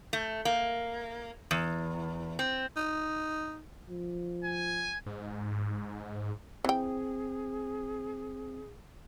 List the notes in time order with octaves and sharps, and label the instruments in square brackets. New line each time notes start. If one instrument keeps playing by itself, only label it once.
[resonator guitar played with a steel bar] A3
A#3
E2
C4
[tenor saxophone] D#4
[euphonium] F3
[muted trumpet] G#5
[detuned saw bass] G#2
[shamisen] E3 G5 [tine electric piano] C4 [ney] G#4